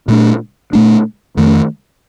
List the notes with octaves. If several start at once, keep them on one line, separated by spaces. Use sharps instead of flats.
A#2 A3 D4
A#2 A3 D4
F2 D#3 A3